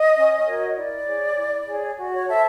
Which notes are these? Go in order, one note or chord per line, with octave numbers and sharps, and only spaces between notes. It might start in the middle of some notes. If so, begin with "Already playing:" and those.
Already playing: D#5
C#4
F#4 A#4 C#5
E4 D5
G#4 C#5
E4
G#4 C#5
F#4
C#5
A4 C5 E5